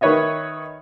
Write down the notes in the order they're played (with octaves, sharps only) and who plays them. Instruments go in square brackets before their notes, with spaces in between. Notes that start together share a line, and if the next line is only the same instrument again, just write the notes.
[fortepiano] D#3 D#4 B4 C#5 D#5 E5